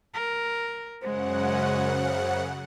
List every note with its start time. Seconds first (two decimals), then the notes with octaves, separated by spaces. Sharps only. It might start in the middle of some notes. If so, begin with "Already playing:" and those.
0.14 A#4
1.02 F#2 C#3 G#3 C5 F#5